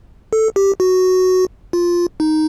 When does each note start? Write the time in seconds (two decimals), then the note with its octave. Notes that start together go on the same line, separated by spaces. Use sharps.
0.33 A4
0.56 G4
0.80 F#4
1.73 F4
2.20 D#4